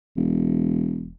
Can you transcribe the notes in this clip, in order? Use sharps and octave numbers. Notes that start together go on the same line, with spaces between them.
E1